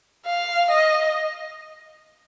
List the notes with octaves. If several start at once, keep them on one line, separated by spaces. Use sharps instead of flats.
F5
D#5